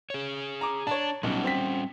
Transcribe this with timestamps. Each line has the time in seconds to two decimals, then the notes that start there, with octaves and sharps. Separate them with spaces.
0.10 G#4 C#5
0.61 A#5 D6
0.87 D4 C#5 A5
1.23 B1 G3 C#4
1.44 C4 B6